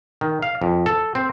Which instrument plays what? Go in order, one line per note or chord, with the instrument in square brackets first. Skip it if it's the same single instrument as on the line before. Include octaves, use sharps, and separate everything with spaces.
[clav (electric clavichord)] D#3
F5
F2
A4
C4